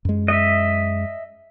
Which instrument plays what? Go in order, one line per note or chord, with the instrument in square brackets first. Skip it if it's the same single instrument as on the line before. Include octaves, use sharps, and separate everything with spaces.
[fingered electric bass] F#2 G#3
[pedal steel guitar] D#5 E5